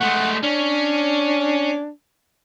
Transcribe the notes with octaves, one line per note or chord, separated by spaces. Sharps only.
G#3 A3 F#5
C#4 D4